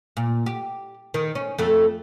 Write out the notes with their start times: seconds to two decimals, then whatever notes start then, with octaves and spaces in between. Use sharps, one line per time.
0.17 A#2
0.46 G4
1.14 D#3
1.35 C#4
1.58 F2 A3